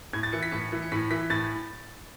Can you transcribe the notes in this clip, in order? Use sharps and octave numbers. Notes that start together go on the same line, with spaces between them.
A2 G#6
A6
E3 C#7
B6
A2 C#7
E3
C#7
A2 B6
E3 B6
A2 A6